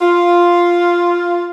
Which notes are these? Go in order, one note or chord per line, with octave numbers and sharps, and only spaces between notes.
F4